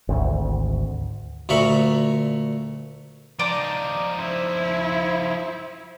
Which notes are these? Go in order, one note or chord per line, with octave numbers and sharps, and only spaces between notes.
G#1 D2
D2 A#2 A#4 E5 B5 C#6
F3 D#4 D5 A#5 C6
E4 C5